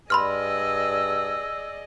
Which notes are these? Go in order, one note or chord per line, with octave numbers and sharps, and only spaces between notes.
G2 G#4 D5 D#5 B5 C6 E6 F6